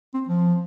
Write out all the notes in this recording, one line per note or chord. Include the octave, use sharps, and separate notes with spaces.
C4
F3